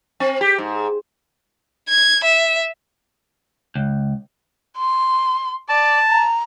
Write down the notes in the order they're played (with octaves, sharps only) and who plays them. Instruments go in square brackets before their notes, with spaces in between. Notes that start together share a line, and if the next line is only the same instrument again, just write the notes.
[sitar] C4
G4
G#2
[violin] G#6
E5
[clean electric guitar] C#2
[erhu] C6
[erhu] D5 [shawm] A5
[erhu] A#5